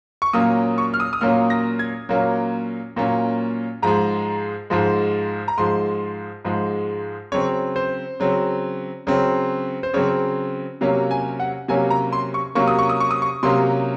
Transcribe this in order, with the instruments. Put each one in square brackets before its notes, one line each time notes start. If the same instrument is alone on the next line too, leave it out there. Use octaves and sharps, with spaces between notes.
[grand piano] C#6
A#2 F#3 A#3 C#4 D#6
C#6
F6
D#6
D#6
A#2 F#3 A#3 C#4 F6
A#6
G#6
A#2 F#3 A#3 C#4
A#2 F#3 A#3 C#4
G#2 F3 G#3 A#5
G#2 F3 G#3
A#5
G#2 F3 G#3 C6
G#2 F3 G#3
C#3 F#3 C4 C#5
C5
C#3 F#3 C4
C#3 F#3 C4
C5
C#3 F#3 C4 C#5
C3 F#3 A#3 C#4 F5
G#5
F#5
C3 F#3 A#3 C#4 G#5
A#5
C6
C#6
C3 F#3 A#3 C#4 C#6
D#6
C#6
D#6
C#6
D#6
C#6
C3 F#3 A#3 C#4 C6